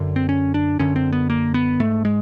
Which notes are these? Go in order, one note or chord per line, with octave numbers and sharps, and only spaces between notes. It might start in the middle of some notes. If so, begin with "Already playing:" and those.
Already playing: F#2 D3
C4
C#4
D4
F#2 D3 C#4
C4
B3
A#3
B3
G#2 A3
G#3